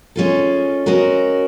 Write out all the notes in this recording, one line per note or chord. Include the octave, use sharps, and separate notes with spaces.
G#3 C#4 F4 A4
G#3 C#4 F#4 A#4